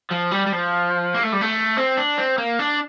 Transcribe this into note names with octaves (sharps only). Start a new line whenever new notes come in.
F3
G3
G3
F3
A#3
A3
G3
A3
C4
D4
C4
A#3
D4